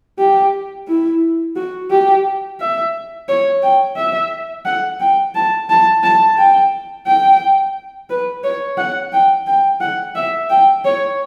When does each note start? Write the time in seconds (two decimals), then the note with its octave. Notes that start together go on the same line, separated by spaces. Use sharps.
0.19 G4
0.88 E4
1.56 F#4
1.91 G4
2.60 E5
3.29 C#5
3.63 G5
3.97 E5
4.65 F#5
5.00 G5
5.35 A5
5.70 A5
6.03 A5
6.38 G5
7.07 G5
8.10 B4
8.44 C#5
8.78 F#5
9.13 G5
9.47 G5
9.81 F#5
10.16 E5
10.50 G5
10.85 C#5